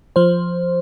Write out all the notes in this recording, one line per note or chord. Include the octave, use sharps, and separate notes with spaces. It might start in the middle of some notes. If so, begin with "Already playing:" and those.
F3 C5